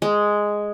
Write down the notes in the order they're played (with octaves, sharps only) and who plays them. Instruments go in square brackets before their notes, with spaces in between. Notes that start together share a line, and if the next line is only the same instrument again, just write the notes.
[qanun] G#3